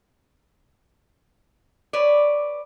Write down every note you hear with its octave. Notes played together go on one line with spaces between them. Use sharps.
B4 C#5 D5